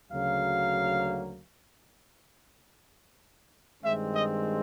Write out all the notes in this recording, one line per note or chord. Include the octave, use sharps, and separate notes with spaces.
D2 C#3 F#3 A#3 F5
G2 D#3 G#3 C4 E5
D#5